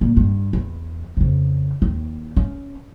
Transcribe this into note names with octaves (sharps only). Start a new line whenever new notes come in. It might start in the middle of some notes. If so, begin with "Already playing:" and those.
A#2
G2
E2
F2 C#3
D#2
C#4